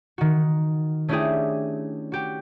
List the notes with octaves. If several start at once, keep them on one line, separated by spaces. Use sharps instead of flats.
D#3 F#4
A3 C#4 D4 E4 G4 G#4
F#4 G4